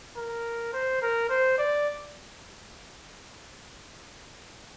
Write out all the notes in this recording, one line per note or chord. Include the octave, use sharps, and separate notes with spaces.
A#4
C5
A#4
C5
D5